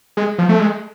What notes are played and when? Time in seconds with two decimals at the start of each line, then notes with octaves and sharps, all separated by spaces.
0.17 G#3
0.38 F3
0.49 A3
0.59 G#3